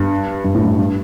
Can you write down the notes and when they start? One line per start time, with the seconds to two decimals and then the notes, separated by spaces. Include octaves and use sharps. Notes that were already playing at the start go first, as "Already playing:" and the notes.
Already playing: G2
0.44 G2
0.55 A2
0.65 G2
0.78 G2